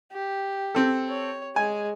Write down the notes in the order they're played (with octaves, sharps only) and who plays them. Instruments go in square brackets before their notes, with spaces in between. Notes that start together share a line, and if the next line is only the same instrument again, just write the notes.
[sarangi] G4
[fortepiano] C4 A4
[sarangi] C#5
[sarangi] G#3 [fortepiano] G#5